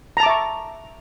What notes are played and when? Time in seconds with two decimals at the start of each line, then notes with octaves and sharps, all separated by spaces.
0.17 A#5
0.20 A5
0.23 D6
0.26 E5
0.29 C#6